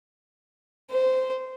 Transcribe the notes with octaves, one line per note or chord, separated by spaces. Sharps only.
C5